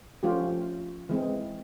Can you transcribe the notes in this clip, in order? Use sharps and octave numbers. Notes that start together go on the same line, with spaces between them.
F3 A3 C#4 F4 G4
E3 G#3 C4